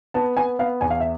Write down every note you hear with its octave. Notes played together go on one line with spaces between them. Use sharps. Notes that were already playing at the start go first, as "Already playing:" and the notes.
B3 A5
B3 G#5
B3 F5
E2 G#5
F5
E5